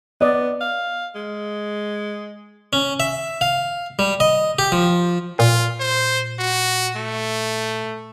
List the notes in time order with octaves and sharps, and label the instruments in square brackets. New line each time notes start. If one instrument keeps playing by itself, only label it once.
[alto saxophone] B3 [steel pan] D5 D#5
[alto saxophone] F5
G#3
[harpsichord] C#4
E5
F5
G3
D#5
G4
F3
[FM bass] A#2 [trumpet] F4
[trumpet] C5
F#4
A3